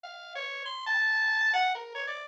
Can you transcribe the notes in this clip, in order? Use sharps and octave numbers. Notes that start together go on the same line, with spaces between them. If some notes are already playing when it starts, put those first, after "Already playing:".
F5
C#5
C6
A5
F#5
A#4
C#5
D5